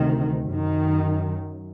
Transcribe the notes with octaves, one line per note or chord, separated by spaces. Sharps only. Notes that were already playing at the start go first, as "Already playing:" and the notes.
Already playing: D2 C3 D#3
F#2 D#3